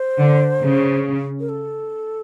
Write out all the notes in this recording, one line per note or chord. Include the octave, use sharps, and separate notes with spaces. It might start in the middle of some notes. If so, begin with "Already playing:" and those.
Already playing: C5
D3
C#3
A#4
A4